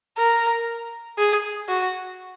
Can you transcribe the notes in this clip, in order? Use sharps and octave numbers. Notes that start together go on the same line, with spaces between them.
A#4
G#4
F#4